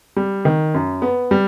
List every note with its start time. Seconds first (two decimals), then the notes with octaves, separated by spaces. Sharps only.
0.16 G3
0.45 D#3
0.74 F#2
1.02 B3
1.31 G3